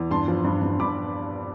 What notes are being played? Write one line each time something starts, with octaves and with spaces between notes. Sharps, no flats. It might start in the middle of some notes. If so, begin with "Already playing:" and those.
Already playing: E2
G2 A5 C6
F3
G2
G2
G2 B5 D6